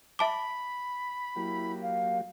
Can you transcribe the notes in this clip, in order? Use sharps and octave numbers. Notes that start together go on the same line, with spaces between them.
E5 A5 B5 D6
F#3 A#3 E4 G4
F5